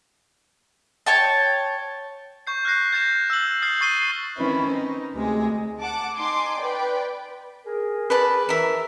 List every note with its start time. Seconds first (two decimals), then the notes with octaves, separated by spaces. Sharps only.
1.06 C#5 G5 A5
2.47 C#6 G6 C7
2.65 F6 F#6 A#6 C7
2.93 G6 A6 C7 E7
3.30 E6 F#6 G6 F#7
3.62 D#6 F6 G6 A6 C7
3.81 C#6 A6 C7 D#7 G7
4.36 D#3 C4 C#4 E4 B4
4.71 D#4
5.14 D2 C3 G#3 G#4
5.81 F#5 A5 D6
6.17 D#4 G#5 C6 D6
6.59 B4 D5 G5
7.66 G#4 A#4
8.10 B4 D5 A5
8.49 E3 A#4 E5